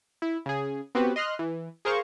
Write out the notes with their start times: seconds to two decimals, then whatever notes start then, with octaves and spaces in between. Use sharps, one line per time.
0.22 E4
0.46 C#3 G#4
0.95 B3 C4 F#4 G4 B4
1.16 D#5 C6 F6 F#6
1.39 E3
1.85 G#4 A#4 C5 F5 C#6